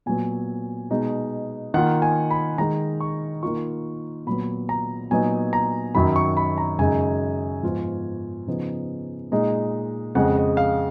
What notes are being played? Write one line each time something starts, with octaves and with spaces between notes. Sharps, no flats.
A#2 F#3 B3 G#5
B2 G#3 D#4
D#3 A#3 F4 F#5
G#5
B5
D#3 G#3 D#4 A#5
C#6
D#3 A#3 F4 C#6
A#2 F#3 B3 B5
A#5
A#2 F#3 B3 D#4 G#5
A#5
F#2 D#3 F#3 B5
C#6
B5
A#5
F#2 C#3 G#3 D#4 G#5
G#2 F3 B3 F4
C#3 F3 B3 D#4
A#2 G#3 D#4
F2 C#3 G#3 F#5
D#5
F5